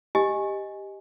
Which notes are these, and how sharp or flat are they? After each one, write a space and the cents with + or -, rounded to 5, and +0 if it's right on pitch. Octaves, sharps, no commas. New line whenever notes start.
G4 +0 D#5 +0 G#5 +0